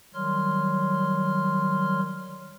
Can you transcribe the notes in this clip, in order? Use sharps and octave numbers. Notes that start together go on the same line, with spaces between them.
D#3 F#3 G3 C#5 C6 F6